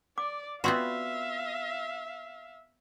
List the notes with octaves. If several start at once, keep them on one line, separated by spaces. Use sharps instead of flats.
D5 D6
B3 C4 F4 F#4 D5 E5 F5 C6